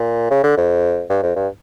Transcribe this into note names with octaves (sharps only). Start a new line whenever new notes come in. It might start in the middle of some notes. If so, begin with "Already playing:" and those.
Already playing: A#2
C#3
D3
F2
G2
F2
G2